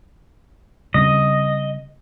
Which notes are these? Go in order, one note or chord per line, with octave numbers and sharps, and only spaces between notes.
C#3 G3 C4 D#5